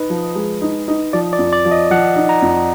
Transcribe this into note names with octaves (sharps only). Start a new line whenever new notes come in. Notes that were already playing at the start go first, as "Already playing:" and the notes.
Already playing: D#4 B4
F3
G#3
D#4
D#4
F3 D5
D5
F2
D5
F3
D#5
F3 F#5
D#4
A#5
F2